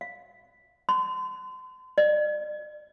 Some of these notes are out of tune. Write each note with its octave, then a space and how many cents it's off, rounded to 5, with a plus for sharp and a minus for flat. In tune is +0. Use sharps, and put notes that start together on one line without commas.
F5 +15
C6 -35
D5 +40